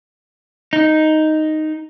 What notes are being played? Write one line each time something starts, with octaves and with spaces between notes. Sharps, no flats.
D#4